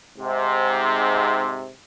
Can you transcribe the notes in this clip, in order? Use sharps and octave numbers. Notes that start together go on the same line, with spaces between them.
G#2 C3